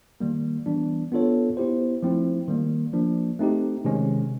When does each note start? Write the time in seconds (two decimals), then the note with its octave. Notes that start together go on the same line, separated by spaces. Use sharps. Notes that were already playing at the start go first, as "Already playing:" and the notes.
0.20 D#3 G3 A#3
0.66 E3 G3 B3 D4
1.12 B3 D4 F4 A4 C#5
1.57 B3 E4 G4 C5
2.03 F3 A3 C4 E4
2.48 D#3 G3 A#3
2.93 F3 A#3 D4
3.39 A3 C4 D#4 G4
3.85 C3 D#3 G#3 C#4